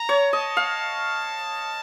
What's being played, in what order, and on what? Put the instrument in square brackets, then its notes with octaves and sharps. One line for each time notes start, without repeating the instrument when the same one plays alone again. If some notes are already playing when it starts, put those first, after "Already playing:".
Already playing: [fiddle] A#5
[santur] C#5
[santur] D#5 [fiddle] A5
[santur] F5